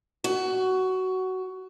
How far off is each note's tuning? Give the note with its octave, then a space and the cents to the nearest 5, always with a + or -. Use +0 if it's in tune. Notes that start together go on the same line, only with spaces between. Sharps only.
F#4 +15